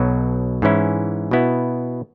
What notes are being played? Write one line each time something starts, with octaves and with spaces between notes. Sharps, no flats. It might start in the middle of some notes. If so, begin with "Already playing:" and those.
Already playing: B1 B2 F#3
G#2 E3 C#4 E4
B2 B3 E4